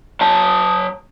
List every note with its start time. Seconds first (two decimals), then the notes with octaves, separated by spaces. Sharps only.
0.21 F#3 A5